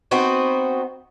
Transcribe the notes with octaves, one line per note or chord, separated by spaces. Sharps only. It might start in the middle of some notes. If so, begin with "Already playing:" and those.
B3 C4 D#4 F#4